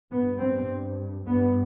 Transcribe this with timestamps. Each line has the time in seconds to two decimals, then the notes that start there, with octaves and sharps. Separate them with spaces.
0.12 G2 B3
0.41 C4
1.27 G2 B3